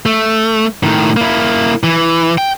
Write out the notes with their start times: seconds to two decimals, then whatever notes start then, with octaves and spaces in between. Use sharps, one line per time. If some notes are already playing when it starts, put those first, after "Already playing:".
0.06 A3
0.83 A2 D#3
1.17 A#3 E4
1.83 E3
2.38 G5